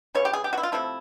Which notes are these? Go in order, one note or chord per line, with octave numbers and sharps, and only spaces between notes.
C#3 E3 G3 C#5
G4
G#4
G4
F#4
E4
F4
C3 F3 A3 E4